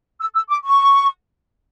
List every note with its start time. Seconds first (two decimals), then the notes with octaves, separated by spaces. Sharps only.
0.20 E6
0.35 E6
0.50 D6
0.65 C#6